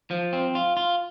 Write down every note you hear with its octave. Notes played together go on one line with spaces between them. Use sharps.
F3
C4
F4
F4